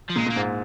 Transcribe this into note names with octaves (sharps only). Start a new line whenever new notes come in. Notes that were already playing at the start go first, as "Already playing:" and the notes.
F3
A#2 G#3
A#2 A#3
G#2